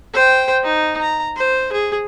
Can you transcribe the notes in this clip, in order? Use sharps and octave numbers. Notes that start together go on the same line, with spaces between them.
C5 G5
D#4
A#5
C5
G#4